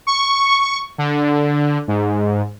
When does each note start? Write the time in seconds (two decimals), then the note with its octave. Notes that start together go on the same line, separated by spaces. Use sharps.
0.07 C#6
0.98 D3
1.88 G#2